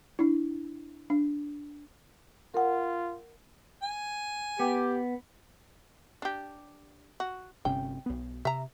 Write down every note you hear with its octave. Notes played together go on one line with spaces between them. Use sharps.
D4 E4
D4
F4 A#4 F#5
G#5
B3 G4
D4 G4
F#4
G1 C3 C#4 G5
B1 B3
C3 E5 A#5